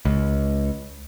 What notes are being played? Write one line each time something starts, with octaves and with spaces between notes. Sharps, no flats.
C#2